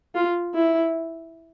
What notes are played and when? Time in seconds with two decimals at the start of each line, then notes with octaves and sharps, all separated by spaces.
0.15 F4
0.55 E4